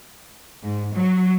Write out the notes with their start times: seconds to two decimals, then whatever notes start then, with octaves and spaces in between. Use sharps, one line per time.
0.63 G#2
0.94 F#3